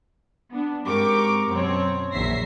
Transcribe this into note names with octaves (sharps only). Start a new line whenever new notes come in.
B3 D4
G#2 C4 G4 A#4 C#6 D6
F#2 B2 C4 C#5
A#1 D#2 F#3 E5 A#6 C7